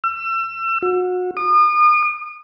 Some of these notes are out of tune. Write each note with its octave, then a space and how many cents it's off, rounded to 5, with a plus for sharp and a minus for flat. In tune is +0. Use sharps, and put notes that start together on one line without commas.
E6 +35
F#4 -30
D#6 -40